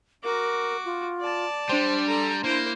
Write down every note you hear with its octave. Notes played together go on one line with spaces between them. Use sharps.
F#4 A#4 D6
F4
D5 A5
G3 D4 C5 C6
A4 A#5
A#3 E4 C5